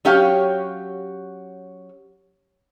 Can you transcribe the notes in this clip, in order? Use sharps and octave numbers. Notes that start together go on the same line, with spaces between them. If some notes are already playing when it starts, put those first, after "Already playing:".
F#3 C#4 G4 C#5 F5